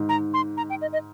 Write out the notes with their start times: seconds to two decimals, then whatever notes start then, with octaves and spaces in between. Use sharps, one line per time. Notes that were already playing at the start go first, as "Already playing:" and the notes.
Already playing: G#2
0.09 A#5
0.34 C6
0.57 A#5
0.70 G5
0.81 D#5
0.93 D#5